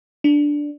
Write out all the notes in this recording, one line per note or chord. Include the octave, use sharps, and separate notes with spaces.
D4